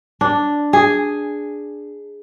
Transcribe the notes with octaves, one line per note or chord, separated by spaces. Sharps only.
D4
G#4